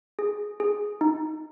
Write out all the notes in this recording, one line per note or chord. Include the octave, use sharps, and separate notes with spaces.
G#4
G#4
D#4